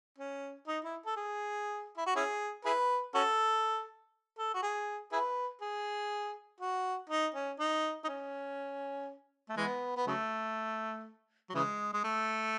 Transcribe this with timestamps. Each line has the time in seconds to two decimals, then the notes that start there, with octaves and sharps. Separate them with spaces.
0.18 C#4
0.67 D#4
0.84 E4
1.06 A4
1.17 G#4
1.97 E4
2.06 F#4
2.16 C#4 E4 G#4
2.65 E4 G#4 B4
3.15 C#4 F#4 A4
4.38 A4
4.54 F#4
4.63 G#4
5.12 E4 G#4 B4
5.62 G#4
6.61 F#4
7.10 D#4
7.35 C#4
7.59 D#4
8.04 D#4
8.09 C#4
9.49 A3
9.57 E3 G#3 B3
9.96 B3
10.07 C#3 F#3 A3
11.49 F#3
11.55 C#3 E3 G#3
11.93 G#3
12.04 A3